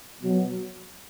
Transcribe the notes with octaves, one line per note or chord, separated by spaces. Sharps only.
B2 F#3